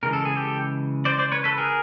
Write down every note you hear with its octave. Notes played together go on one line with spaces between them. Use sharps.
C#3 E3 G#3 A#4
A4
G#4
G4 A4
C5 D5
C5 D5
B4 C#5
A4 B4
G#4 A#4